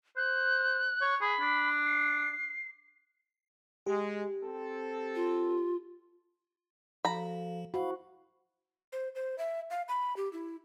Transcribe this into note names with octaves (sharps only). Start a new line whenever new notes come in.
C5 F#6
C#5
G#4 B5
D4
C7
G#3 G4
C4 A4
F4
F3 F#4 A4 F5 A#5 B5
E4 F#4 C5 F5 B5
C5
C5
E5
F5
B5
G4
E4